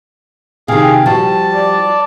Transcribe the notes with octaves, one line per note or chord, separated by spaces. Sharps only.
C3 D#3 G#4 F5
F3 G3 F#4 A5
D5